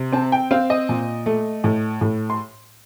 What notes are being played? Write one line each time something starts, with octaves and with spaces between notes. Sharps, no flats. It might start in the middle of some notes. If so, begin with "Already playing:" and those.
Already playing: C3
C4 A5
G5
C4 F5
D#5
A#2
A3
A2
A2
C6